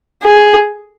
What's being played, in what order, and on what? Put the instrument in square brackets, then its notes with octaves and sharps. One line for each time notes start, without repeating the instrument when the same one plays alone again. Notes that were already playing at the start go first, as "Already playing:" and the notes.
[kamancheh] G#4